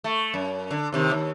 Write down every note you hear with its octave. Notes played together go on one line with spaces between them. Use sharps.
A3
F#2
D3
D#2 C3 D#3
D#2